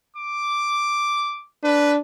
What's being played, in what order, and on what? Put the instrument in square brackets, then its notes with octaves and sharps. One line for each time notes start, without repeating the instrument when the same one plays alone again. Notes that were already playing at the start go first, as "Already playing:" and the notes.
[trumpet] D6
[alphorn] D4 [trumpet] B4